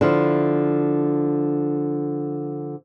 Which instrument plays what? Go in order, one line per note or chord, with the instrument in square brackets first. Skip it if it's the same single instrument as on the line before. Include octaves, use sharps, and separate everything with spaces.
[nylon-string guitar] D3 F3 E4